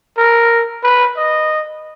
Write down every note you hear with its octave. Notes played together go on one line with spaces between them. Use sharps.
A#4
B4
D#5